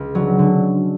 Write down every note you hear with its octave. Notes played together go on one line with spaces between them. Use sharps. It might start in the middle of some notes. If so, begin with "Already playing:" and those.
Already playing: C#2
D3 F#3
D3